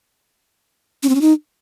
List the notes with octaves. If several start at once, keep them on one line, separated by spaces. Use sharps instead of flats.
C#4
C4
C#4
D#4